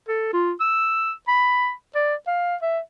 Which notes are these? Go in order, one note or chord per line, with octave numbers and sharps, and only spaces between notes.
A4
F4
E6
B5
D5
F5
E5